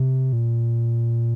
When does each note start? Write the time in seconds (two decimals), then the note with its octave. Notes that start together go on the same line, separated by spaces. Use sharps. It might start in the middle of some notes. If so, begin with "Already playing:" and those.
Already playing: C3
0.33 A#2